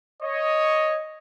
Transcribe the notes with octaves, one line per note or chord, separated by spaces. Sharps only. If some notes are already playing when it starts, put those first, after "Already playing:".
C#5 D#5